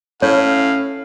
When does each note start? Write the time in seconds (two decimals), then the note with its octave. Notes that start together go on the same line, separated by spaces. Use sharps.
0.22 A2 C#4 C#5 F5